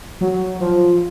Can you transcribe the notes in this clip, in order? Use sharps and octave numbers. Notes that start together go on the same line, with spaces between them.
F#3
F3